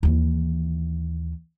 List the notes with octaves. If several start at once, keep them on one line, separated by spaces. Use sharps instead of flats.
D#2 E3